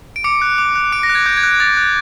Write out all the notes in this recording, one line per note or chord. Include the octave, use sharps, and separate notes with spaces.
D7
D6 C#7
F#6
D6
F#6
D6 D7
A#6
F#6
G#6
D6 G6
G#6
F#6
D6 A6
F#6